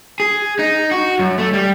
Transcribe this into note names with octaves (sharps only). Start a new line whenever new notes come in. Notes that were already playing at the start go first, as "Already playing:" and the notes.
G#4
D#4
F#4
F#2
A3
G3